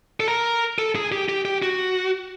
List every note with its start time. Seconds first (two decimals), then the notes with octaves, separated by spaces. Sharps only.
0.20 A4
0.28 A#4
0.78 A4
0.95 G#4
1.12 G4
1.29 G4
1.45 G4
1.62 F#4